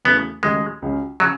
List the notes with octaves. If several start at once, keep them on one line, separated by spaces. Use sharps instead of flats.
E2 C#3 F#3 A3 B3 E4
D#2 C#3 F#3 G#3 A3 D#4
C#2 C#3 F#3 C#4
C#3 F#3